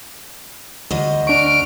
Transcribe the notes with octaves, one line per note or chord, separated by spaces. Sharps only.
D2 D#5
D4 C#6 F6 D7